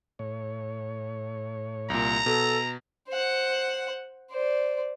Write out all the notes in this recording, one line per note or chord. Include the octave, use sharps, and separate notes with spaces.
A2 C#5
C2 A#2 A#5
B2 A4
C5 F#5
C5 D5